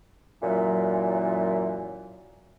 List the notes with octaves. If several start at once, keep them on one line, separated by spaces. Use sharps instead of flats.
F#2 A#2 E3 F#3